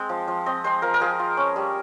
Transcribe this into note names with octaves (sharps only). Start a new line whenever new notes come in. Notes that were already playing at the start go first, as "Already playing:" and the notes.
Already playing: G#3 C4
F3
F3
C4 D#5
G#3 C5
F3 A#4
A#4
F3 G#4
F4
C#4
G3